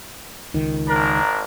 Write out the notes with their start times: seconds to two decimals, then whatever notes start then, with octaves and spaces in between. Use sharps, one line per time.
0.54 C#2 D#3
0.88 G#1 D4 A#4